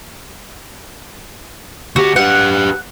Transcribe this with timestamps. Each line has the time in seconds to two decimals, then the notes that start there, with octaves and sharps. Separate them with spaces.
1.96 D2 F#4 G4
2.16 G4 B4 F#5